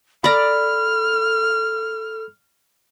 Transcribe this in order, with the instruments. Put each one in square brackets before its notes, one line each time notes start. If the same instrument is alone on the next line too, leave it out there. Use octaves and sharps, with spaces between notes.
[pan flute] A4 [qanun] D5 A#5 [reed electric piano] B5 [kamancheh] F6